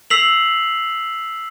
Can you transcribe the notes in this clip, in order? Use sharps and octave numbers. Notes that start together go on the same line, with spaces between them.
E6 B6 C7 F7 F#7